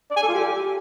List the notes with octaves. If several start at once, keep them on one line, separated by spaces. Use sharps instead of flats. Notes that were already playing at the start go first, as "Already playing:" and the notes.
D5
G#5
A4
F4
G4